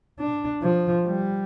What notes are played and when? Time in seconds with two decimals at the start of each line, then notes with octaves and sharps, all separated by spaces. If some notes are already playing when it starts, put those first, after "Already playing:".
0.19 D4
0.62 F3
1.04 G3